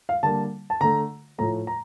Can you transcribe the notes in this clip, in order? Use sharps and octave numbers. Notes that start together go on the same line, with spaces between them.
F5
D3 G3 A#3 A5
A5
D3 A3 A#5
A2 F3 A3 A#5
A#5